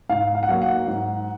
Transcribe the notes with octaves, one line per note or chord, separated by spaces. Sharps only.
G#2 F5
F5
F#5
F#3 A#3 F5
F#5
G#2